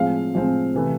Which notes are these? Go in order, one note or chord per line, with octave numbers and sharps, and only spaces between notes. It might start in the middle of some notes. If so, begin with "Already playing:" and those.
Already playing: A2 F3 G#3 C4 F5
A2 F3 G#3 C4
C3 E3 A3